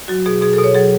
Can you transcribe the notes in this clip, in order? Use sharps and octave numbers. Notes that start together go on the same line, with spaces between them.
F#3 F#4
B2 G#4
B2 G#4
A4
B2
C#5
F#3 G#4